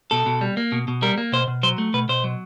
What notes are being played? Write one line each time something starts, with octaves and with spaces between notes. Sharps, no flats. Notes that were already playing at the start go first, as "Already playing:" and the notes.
B2 A4
B2
G3
A#3
B2
B2
G3 A#4
A#3
B2 C5
B2
F#3 C5
A3
B2 B4
B2 C5
F#3